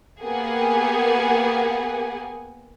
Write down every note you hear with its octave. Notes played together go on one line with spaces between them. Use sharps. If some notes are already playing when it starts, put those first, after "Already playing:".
A#3 B3 G4 G#4 F#5 G#5